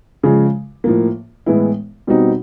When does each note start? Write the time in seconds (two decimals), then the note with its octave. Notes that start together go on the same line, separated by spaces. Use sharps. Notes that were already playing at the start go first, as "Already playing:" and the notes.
0.23 C#3 F3 G#3
0.84 A2 F3 A#3
1.46 A2 E3 G#3 B3 E4
2.07 B2 G3 C4 D#4 F#4